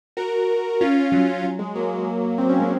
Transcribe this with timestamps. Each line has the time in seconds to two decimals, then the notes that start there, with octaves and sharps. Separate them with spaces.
0.17 F#4 A#4
0.81 C#4 F4
1.12 F#3
1.44 F#3
1.59 G#3
1.75 F#3 A#3
2.38 C4
2.49 C#4
2.59 G#3 C4